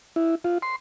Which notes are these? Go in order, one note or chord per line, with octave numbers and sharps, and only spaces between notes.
E4
F4
C6